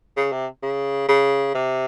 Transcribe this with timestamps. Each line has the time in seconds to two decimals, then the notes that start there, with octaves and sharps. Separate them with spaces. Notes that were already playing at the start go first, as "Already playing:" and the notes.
0.17 C#3
0.32 C3
0.63 C#3
1.09 C#3
1.55 C3